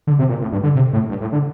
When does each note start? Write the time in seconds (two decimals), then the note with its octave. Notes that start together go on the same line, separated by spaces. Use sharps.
0.07 D3
0.19 C3
0.29 A#2
0.41 A2
0.52 G2
0.63 D3
0.75 C3
0.93 A2
1.09 G2
1.21 A2
1.32 D3